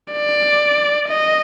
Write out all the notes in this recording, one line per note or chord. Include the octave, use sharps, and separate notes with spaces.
D5
D#5